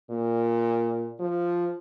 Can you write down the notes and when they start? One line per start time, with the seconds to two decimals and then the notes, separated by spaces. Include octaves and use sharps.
0.10 A#2
1.19 F3